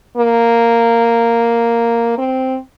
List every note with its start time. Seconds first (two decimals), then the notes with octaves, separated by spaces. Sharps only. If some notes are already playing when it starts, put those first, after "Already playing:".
0.17 A#3
2.18 C4